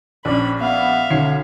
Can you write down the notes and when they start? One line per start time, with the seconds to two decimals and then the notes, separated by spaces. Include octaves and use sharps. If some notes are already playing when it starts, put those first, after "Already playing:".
0.25 A#1 C#4 D4 B5
0.59 B3 E5 F5
1.10 B1 D3 C#4 C7